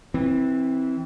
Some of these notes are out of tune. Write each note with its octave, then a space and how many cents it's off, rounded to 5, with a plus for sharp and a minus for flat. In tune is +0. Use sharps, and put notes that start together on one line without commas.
E3 -15 C4 +10